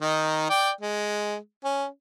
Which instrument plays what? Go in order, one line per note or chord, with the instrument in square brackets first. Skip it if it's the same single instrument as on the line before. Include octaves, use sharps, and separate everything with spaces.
[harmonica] D#3 D#4
D5 G5
G#3
C#4